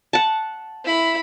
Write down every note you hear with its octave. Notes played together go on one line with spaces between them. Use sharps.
F#5 A5
E4 B5